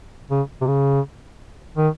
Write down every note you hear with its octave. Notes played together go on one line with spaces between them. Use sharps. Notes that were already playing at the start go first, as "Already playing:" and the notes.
C#3
C3
C#3
D#3